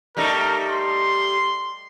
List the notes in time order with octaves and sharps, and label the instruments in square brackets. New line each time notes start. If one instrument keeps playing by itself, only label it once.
[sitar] G3 A3 D#4 [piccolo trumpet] A#4
[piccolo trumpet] C6